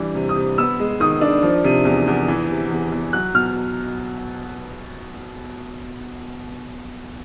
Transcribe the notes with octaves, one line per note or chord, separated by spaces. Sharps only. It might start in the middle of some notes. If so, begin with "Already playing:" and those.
Already playing: E3 G3 D4
C3
D#6
C3
B3 E6
G#3
D#3 D#6
D4
F3
C3
E2
E2
E3
C3
E2
E2
F#3 F#6
B2 F6